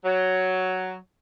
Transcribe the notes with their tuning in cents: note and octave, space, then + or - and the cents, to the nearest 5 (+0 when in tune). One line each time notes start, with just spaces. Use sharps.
F#3 +5